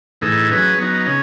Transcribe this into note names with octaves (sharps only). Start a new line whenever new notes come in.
A2 E3 A3 D#4 G#4
F#3 C#4 G#4 B4
F#3 B3 D#4
C#3 C#4